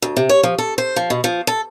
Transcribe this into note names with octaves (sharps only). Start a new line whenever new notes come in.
D2
C3
C#5
F3
A4
C5
F3
B2
F3
A4